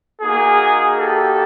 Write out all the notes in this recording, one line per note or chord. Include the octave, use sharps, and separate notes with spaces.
A#3 D#4 F#4 G#4
G4 A4